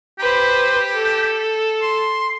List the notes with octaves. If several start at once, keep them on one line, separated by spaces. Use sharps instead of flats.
G4 B4 C5
A4
C6